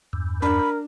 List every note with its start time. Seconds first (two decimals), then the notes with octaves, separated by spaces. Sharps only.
0.13 E2 G2
0.42 D4 A#4 B5